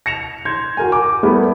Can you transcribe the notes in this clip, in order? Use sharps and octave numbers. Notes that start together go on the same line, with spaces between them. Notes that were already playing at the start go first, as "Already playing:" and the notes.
A#6 C#7 E7 F7
C6 G6 G#6
F#4 A#4 G#5
D6
G3 A3 B3 E4 A#4